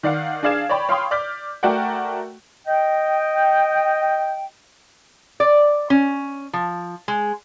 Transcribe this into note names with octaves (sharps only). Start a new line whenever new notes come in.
D#3 D5 F5 F#5
D4 G#4 D5 F5 G#6 E7
C#5 D5 G5 B5
C#5 F5 G5 B5 C6 D#6
D5 D6 F6 G6 B6
A3 F#4 A#4 D5 F#5 G5
D#5 G5
D5
C#4
F3
G#3